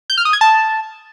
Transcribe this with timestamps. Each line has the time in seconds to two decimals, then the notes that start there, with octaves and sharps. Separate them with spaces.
0.10 G6
0.17 F6
0.25 D#6
0.33 G#6
0.41 A5